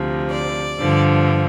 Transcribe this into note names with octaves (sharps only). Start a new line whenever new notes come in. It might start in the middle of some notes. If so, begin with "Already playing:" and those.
Already playing: D2 C3 F3
D5
G2 D3 F3